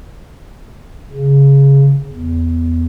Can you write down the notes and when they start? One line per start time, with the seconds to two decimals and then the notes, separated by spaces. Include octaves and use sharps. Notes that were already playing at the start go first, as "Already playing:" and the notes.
1.12 C#3
2.12 E2